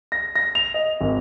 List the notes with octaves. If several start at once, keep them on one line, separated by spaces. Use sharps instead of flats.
A#6
A#6
F7
D#5
G#1